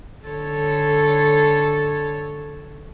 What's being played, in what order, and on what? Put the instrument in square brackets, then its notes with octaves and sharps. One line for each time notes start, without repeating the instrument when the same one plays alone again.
[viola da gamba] D3 A4 C#5